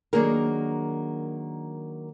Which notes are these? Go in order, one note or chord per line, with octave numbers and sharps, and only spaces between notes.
D#3 F#3 A#3 D4 G#4 A#4